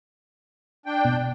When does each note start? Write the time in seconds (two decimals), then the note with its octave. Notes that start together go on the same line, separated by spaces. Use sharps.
0.86 D4 G5
1.05 B2